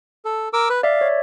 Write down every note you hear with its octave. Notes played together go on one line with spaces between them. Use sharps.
A4
A#4 D6 E6
B4
D5 E5 F5
C#5